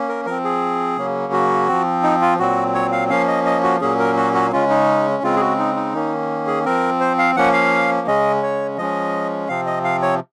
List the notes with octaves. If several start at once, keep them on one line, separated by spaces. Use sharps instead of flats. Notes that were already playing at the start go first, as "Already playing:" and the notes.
Already playing: A#3 C#4
A#4
F3 C4 A#4
G#4
C#3 F#3 A#3 C#4
F#4
F3 C4
D#4
F4
A#2 F#3 C4 F#4
C#5
F5
F3 A#3 C#4 F5
D#5
D#5
F#4
A#2 F#3 A#3 C#4 G#4
A#4
F#4
F#4
C#3 G#3 C#4 F4
D#4
C#3 G#3 C4 F4
G#4
F#4
D#4
D#4
D#3 A#3 C#4
G#4
F3 C4 A#4
C5
F5
F3 A#3 C#4 F#5
F5
C#3 G#3 C#4 D#5
C#5
F3 G#3 C#4 D#5
C3 F3 C4 F5
D#5
F5
C#5